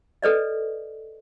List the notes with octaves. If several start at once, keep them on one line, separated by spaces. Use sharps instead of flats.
A4 B4 D5 D#5